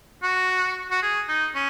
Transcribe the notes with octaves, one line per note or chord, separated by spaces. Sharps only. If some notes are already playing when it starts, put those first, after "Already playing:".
F#4
F#4
G#4
D#4
C#4